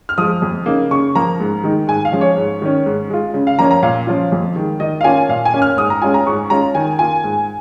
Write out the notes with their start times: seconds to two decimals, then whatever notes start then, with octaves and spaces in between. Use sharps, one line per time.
0.09 F6
0.18 F3 G#3 D#6
0.42 F2
0.66 C#3 A#3 D#4
0.91 C#3 C#6
1.15 F3 A#3 A#5
1.40 G#2
1.64 D#3 G#3 D#4
1.88 G#2 G#5
2.05 F5
2.12 F3 G#3 C#4
2.21 C#5
2.37 G#2
2.62 D#3 C#4
2.86 G#2
3.10 G#3 F4
3.34 C#3
3.47 F5
3.59 F3 A#3 C#4 A#5
3.71 A#5
3.83 A#2 F5
4.07 F3 C#4 F4
4.32 F2
4.56 D#3 G#3
4.80 D#3 D#5
5.01 F5
5.04 A#3 C#4 F4 G#5
5.29 A#2 F5
5.45 G#5
5.54 A#3 C#4
5.62 F6
5.77 G#2 D#6
5.90 A#5
6.02 G#3 C#4 F4 G#5
6.14 A#5
6.26 G#2 C#6
6.50 G#3 C#4 F4 A#5
6.75 D#3 G#5
6.99 A#3 F4 G#5
7.24 G#2